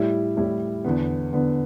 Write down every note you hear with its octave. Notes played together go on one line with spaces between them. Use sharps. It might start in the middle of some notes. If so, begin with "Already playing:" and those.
Already playing: A2 G3 E4
A2 G3 E4
E2 D3 B3
E2 D3 B3